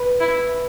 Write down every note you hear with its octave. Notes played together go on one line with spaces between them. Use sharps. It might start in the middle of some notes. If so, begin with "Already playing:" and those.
Already playing: B4
E4